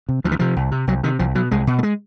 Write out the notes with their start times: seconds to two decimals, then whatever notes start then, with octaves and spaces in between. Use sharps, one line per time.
0.09 C3
0.24 D2 F3
0.31 E3
0.39 C3 F3
0.56 C2
0.71 C3
0.87 C2 F#3
1.03 C3 D#3
1.19 C2 F3
1.35 B2 F#3
1.51 C2 G#3
1.67 B2
1.79 A3
1.83 G#3